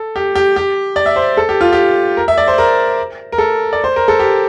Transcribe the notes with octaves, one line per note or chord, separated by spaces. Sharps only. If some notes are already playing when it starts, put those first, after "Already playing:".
Already playing: A4
G4
G4
G4
D5
E5
C5
A4
G4
F4
G4
A#4
E5
D5
C5
A#4
A#4
A4
D5
C5
A#4
A4
G4